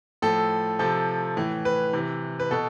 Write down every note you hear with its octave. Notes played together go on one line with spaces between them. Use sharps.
A2 F3 A4
C3 F3 A4
A2 E3
B4
C3 E3
B4
B2 A4